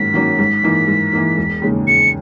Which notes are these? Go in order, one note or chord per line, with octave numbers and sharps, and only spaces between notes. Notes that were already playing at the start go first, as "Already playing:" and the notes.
Already playing: G#2 D#3 F#3 A#3 C#4 B6
D#3 F#3 A#3 C#4
G#2
E3 A#3 D#4
G#2
E3 A#3 D#4
E1
D#2 C#3 G#3 D#4
E1 C#7